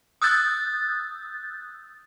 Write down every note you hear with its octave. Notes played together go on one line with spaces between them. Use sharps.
D#6 E6 F#6 G6 A6